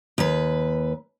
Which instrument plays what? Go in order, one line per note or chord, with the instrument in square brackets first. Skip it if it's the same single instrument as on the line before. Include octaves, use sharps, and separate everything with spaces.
[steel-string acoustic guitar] D#2 B4